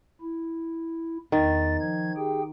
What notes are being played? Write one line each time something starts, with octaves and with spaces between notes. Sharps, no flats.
E4
E2 D#3 A6
F3 G#6
G4 G#4 G5